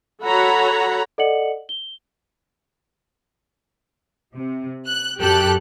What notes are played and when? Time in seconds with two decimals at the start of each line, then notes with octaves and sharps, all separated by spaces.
0.24 F#4 A4 C#5 F#5 A#5 B5
1.18 A4 D5 D#5 F#5 C#7 F#7
1.69 G7
4.35 C3
4.88 F#6
5.20 F#2 G4 A4 F#6